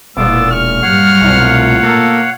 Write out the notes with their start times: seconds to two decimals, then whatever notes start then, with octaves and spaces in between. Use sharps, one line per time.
0.17 E1 A#2 B3 F4 D6 E6
0.51 C#6 F6
0.82 G2 F#3 C#5 F5 F#5
1.21 C2 B2 A3 F4
1.83 A#3 A4